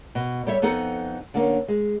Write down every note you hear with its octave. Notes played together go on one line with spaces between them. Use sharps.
B2
G3 A4 C#5 E5
F2 B3 D#4 A4 F#5
D3 A#3 C4 C#4
G#3